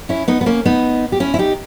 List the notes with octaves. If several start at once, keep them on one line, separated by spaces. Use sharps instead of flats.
C#4 E4
B3 D#4
B3
A#3 C#4
B3 D#4
G4
C#4 E4
E4
D#4 G4